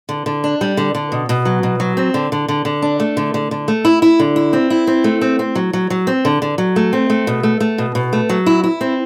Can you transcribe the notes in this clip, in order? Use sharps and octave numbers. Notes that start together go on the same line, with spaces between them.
D3
D3
D4
G3
D3
D3
B2
B2
F#3
B2
F#3
C4
D3
D3
D3
D3
D4
A3
D3
D3
D3
A3
E4
E4
D3
E4
C4
E4
C4
A3
C4
C4
F#3
F#3
F#3
C4
D3
D3
F#3
A3
C4
A3
B2
A3
A3
B2
B2
A3
F#3
E4
E4
C4